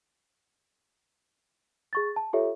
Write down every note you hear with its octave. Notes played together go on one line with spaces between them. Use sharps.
G#4 C#6 A6
A5
F4 G4 A4 C#5 E5